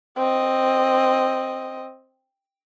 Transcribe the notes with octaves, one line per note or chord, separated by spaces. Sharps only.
C4 D#5